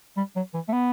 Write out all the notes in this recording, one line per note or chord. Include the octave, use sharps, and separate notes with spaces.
G3
F#3
E3
A3
B3